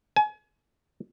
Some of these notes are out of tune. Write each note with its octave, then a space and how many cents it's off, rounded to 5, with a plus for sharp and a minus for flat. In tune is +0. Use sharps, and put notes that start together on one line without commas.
G#5 +35